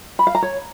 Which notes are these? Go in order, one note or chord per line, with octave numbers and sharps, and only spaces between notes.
B5
F5
A#5
C#5